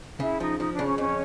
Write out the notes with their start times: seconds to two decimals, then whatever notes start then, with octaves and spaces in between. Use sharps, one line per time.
0.20 C#3 E4
0.40 F3 D#4
0.59 F3 D#4
0.73 D4
0.79 C#3
0.86 C#4
0.98 F2 C#4